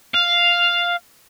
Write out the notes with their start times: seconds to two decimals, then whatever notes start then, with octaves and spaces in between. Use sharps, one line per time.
0.14 F5